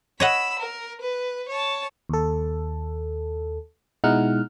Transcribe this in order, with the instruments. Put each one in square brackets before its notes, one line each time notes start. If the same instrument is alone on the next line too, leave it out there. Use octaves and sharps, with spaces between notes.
[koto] C#5 D#5 F#5 [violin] B5 E6
[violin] A#4
B4
C#5 A5
[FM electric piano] D#2 A4
B2 G#3 D#4 E4 F#5 F6